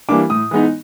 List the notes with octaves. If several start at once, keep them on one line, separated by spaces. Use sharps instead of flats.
E3 G3 A#3 D4 D6
A2 D#6
E3 G#3 B3 D#4